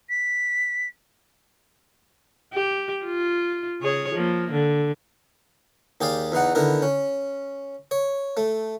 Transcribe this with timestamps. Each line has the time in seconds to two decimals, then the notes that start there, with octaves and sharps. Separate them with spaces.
0.09 B6
2.53 G4
3.05 F4
3.81 C#3 G#4 C#5
4.14 F3 A#3
4.52 D3
6.01 D#2 G4 G#4 D5 F5
6.32 E2 E3 D#4 F#5
6.55 D3 D#3 B3 E4 A#4
6.82 C#4
7.91 C#5
8.37 A3